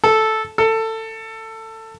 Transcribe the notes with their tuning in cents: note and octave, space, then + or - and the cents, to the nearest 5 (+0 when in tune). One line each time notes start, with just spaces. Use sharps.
A4 -5
A4 +20